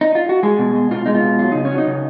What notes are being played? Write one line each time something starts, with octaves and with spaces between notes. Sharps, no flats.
D#4
F4
F#4
G#3 G#4
B2
G#3
B2 F4
G#3 D#4
F4
B2
F#3 F4
C#3 D#4
C#4
F#3
D#4
C#3